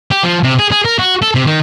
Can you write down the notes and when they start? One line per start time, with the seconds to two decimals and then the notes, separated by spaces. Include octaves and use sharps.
0.11 G4
0.23 F3
0.43 C3
0.59 G#4
0.72 G#4
0.85 A#4
0.99 F#4
1.22 A4
1.35 C3
1.47 D#3